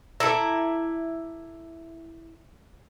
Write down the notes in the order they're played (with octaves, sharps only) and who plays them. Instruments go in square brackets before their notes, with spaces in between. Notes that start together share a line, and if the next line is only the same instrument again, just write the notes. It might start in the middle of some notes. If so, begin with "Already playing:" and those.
[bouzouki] E4 E5 [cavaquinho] A4 D5 A#5